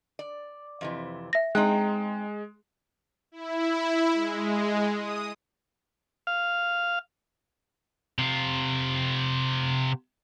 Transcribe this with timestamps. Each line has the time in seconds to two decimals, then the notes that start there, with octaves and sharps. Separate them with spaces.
0.19 D5
0.81 F2 C3 E3
1.33 E5 A#6
1.55 G#3 C4 D#4 G5 F#6
3.32 E4
4.14 G#3
4.97 D#6
6.27 F5
8.19 C3 F4